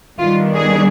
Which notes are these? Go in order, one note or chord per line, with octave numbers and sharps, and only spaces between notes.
D#3 G3 B3 D4 F4
G#4